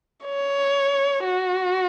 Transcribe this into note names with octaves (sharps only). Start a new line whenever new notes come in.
C#5
F#4